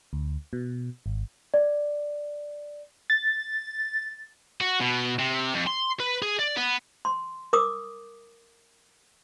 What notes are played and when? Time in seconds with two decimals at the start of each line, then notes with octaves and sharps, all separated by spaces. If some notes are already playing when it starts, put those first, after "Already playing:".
0.13 D2
0.53 B2
1.06 G#1
1.54 D5
3.10 A6
4.61 F#4
4.80 B2
5.19 C3
5.54 F2
5.67 C6
6.00 B4
6.22 G#4
6.39 D5
6.57 B3
7.05 C6
7.53 A#4 D6 D#6